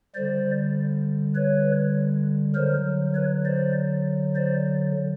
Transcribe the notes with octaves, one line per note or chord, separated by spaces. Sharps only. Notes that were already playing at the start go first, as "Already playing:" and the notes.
D3 G3 C5 D5
B4 C#5
D3 F#3 A#4 C5
B4 C#5
C5 D5
C5 D5